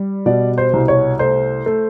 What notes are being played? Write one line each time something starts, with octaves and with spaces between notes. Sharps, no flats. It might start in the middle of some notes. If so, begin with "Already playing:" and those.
Already playing: G3
B2 D5
C5
C2
C#5
A3 C5
A3